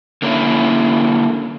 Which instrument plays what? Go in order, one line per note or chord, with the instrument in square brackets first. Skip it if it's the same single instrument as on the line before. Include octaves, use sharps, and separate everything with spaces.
[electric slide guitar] D3 A#3 C#4 E4